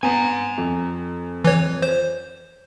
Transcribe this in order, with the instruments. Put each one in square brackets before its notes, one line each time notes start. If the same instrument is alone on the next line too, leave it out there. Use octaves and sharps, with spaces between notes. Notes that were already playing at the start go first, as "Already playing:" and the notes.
[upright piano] B3 [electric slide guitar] G#5 A#5
[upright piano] F2
[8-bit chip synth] E3 C#5
C5